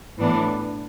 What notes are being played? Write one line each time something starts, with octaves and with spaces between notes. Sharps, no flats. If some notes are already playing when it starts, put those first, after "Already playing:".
A2 E3 B3 D4